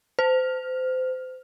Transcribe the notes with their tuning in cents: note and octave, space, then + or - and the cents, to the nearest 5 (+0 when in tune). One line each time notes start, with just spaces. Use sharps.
C5 -30